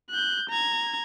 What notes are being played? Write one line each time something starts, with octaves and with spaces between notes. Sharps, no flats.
F#6 G6
A#5 G#6